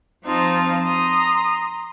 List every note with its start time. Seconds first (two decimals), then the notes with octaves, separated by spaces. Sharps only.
0.23 F2 F3 C4 D#4 F4 A5
0.83 A#5 C6 D#6